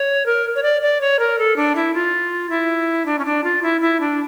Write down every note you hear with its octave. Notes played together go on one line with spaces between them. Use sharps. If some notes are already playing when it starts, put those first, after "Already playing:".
Already playing: C#5
A#4
C#5
D5
D5
C#5
A#4
A4
D4
E4
F4
E4
D4
C#4
D4
F4
E4
E4
D4